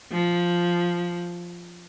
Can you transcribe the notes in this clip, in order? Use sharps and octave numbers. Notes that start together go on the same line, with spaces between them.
F3